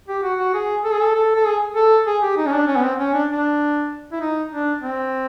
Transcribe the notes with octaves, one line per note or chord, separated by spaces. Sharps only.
G4
F#4
F#4
G#4
A4
G#4
A4
A4
A4
G#4
A4
G#4
G4
D#4
C#4
D4
C#4
B3
C4
C#4
D4
D4
E4
D#4
D4
C4